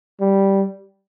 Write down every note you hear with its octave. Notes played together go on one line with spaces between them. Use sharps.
G3